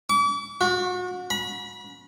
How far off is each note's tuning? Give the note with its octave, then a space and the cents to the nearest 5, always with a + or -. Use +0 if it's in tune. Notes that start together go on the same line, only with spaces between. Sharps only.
D6 -40
F#4 -35
B5 -35